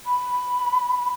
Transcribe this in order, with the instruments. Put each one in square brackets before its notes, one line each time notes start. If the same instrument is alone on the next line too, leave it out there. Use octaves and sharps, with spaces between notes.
[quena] B5